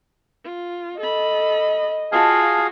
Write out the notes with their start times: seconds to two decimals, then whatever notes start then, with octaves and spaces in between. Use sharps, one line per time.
0.44 F4
1.00 A4 D#5 B5
2.12 F4 F#4 G#4 F5 A5